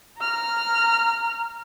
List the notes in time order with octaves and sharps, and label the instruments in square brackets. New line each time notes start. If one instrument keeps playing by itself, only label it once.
[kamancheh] A#5 F6